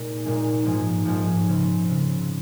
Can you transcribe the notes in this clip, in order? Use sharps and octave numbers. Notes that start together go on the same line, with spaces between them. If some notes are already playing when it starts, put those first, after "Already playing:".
Already playing: A#2 G#3 C4 D#4 F4
A#2 G#3 D#4 G#4
G#2 F3 G#3 D#4 G#4
G#2 F3 G#3 D#4 G#4
C#3 G#3 C4
C#3 G#3 C4